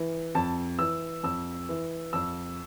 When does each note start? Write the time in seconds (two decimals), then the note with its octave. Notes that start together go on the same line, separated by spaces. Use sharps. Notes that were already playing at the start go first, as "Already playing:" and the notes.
Already playing: E3
0.35 F2 A5
0.79 E3 E6
1.23 F2 E6
1.69 E3
2.13 F2 E6